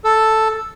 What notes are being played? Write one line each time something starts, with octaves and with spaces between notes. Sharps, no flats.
A4